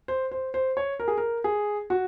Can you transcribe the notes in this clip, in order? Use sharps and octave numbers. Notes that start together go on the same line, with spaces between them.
C5
C5
C5
C#5
A#4
G#4
A#4
G#4
F#4